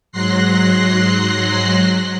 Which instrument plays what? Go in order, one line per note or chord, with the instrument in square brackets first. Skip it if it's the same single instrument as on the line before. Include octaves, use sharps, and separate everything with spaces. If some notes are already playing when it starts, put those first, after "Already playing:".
[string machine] G#2 F#3 C6 F#6 A#6 C7